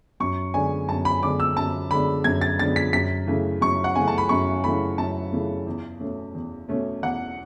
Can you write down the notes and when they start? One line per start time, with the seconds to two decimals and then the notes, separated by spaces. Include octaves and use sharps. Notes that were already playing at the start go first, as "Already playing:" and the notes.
0.20 F#2 C#6
0.54 D3 G#3 B3 D4 G#5
0.88 F#2 A5
1.05 B5
1.22 D3 G#3 B3 D4 D6
1.40 E6
1.56 F#2 A5
1.90 D3 G#3 B3 D4 B5
2.24 F#2 G#6
2.41 A6
2.59 D3 G#3 B3 D4 A6
2.76 B6
2.93 F#2 B6
3.27 C#3 E3 A3
3.61 F#2 C#6
3.84 F#5
3.96 C#3 E3 A3 G#5
4.08 A5
4.18 B5
4.29 F#2 C#6
4.64 C#3 E3 A3 B5
4.98 F#2 A5
5.32 C#3 E3 A3
5.66 E2
6.00 B2 A3 C#4
6.35 E2
6.68 B2 A3 C#4
7.03 E2 F#5